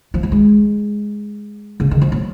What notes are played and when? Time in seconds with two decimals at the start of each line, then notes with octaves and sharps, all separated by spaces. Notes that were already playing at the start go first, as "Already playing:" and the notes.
0.14 F3
0.23 F#3
0.32 G#3
1.80 C#3
1.91 D#3
2.01 F3
2.12 F#3